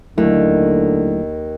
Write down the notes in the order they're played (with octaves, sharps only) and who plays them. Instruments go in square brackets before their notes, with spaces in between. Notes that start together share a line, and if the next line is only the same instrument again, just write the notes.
[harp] D#2 [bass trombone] D3 [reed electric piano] F#3 A3 E4